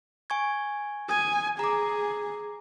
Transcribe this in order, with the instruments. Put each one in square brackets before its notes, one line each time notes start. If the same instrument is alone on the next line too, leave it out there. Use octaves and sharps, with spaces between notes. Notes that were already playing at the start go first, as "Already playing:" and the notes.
[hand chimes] G#5 C#6 G#6
[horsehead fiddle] G#5 [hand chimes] D#6 G#6
[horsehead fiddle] G#4 [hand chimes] A#5 D6